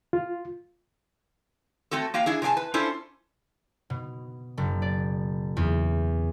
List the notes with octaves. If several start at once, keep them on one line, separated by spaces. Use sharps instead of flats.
F4
A3 C4 F#4 A4
A#3 F#4 F5 G5
D4 E4 G#4
C3 G#4 D5 G#5 A5
B4
C#4 D4 E4 F4 A4 C5
B2
F#1
D5
E2